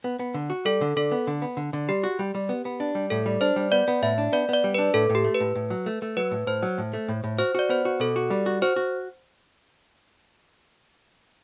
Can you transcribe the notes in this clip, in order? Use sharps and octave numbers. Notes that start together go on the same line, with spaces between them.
B3
B3
D3
F#4
G3 A4
D3
D3 A4
B3
D3
B3
D3
D3
G3 G4
F#4
G3
G3
B3
B3
D4
G3
A2 A4
G3
D4 C5
G3
B3 D5
B3
A2 E5
D4
B3 D5
B3 D5
G3
D4 B4
A2 A4
A2
G4
A3
B4
A2
A2
F#3
A3
A3
F#3 B4
A2
A2 C5
F#3
A2
A3
A2
A2
F#4 C5
F#4 D5
B3 C5
F#4
B2 A4
F#4
G3
F#4
F#4 C5
F#4